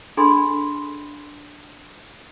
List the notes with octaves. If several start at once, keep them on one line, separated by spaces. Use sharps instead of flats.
D4 G#4 A4 G#5 B5 C6